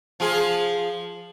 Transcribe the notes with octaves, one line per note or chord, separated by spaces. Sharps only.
F3 F4 G#4